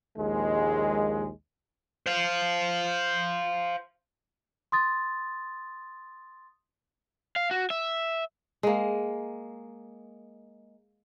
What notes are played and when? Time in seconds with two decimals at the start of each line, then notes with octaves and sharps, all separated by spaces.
0.17 A#1 D#2 G#3
2.06 C5 F5
4.72 C6 D#6 A6
7.36 F5
7.51 F#4
7.70 E5
8.63 G#3 A#3